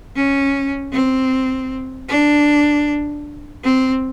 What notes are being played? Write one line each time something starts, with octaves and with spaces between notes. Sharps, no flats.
C#4
C4
D4
C4